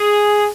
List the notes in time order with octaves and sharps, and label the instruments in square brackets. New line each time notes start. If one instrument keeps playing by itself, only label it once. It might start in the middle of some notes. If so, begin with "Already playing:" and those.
Already playing: [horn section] G#4